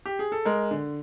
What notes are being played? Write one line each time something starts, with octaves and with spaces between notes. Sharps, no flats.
G4
G#4
A4
G#3 A#4
D3